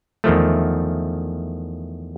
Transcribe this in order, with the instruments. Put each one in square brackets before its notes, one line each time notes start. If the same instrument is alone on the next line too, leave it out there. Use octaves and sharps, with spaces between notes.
[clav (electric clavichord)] E2 D#3 F3 A3